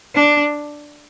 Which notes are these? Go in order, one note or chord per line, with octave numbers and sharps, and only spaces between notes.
D4